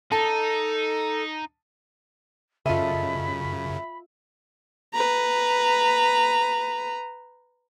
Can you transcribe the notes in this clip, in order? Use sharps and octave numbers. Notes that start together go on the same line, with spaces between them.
D#4 A4 A5
F#2 C#3 F4 A4 D#5 E5 B5
B4 A#5